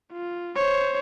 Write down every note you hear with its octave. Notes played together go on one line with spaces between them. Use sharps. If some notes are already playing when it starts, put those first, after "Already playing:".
F4
C5 C#5